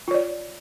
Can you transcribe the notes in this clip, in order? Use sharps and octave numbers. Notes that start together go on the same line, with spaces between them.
F4 C#5 D5